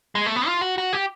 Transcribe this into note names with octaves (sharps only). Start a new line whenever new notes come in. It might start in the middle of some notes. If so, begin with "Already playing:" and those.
G#3
A3
B3
F4
F#4
F#4
G4